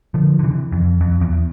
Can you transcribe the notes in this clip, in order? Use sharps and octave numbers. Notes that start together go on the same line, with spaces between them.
D3 F3
D3
C3 E3
F2
F2
E2